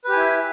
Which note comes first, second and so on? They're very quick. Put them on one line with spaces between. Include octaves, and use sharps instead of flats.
B4 G4 G#5 E4 E5